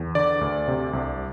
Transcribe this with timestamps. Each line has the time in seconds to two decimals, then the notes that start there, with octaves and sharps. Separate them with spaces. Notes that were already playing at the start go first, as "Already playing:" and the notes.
Already playing: E2
0.15 D3 D5
0.41 D2
0.68 C3
0.93 C2